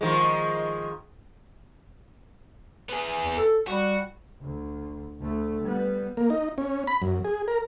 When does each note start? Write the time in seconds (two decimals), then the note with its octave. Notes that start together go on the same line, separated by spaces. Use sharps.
0.01 D#3 F3 G#3
2.89 B3 G#4
3.23 E2
3.37 A4
3.67 G3 F#4
4.41 D2
5.20 D2 A3
5.63 G3 B3
6.17 A#3
6.30 D#4
6.58 C#4
6.87 B5
7.02 F#2
7.25 G#4
7.48 A#4